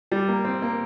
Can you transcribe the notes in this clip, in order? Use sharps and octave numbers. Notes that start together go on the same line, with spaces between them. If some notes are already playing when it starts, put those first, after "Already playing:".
G3
A#3
C4
A#3